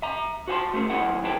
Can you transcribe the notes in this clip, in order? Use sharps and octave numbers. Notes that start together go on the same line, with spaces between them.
E5 A#5
F#4 C5 F#5 G#5 A5 C6
A3 C#4 G#4
D#2 F#3 E4 F#5
E4 G#4 B4 G5 A5 A#5